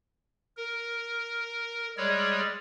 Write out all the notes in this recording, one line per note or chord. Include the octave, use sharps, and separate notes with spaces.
A#4
G3 G#3 G#4 C#5 D5